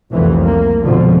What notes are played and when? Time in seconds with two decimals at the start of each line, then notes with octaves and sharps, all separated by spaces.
0.12 F1 C2 F2 E3
0.47 A#3
0.83 F2 G#2 B2 D3 F3